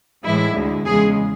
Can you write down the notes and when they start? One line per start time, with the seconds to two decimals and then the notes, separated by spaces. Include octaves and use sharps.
0.24 A2 E3 G#3 E4
0.55 D2 D3 G#3
0.86 E2 C#3 G#3 G#4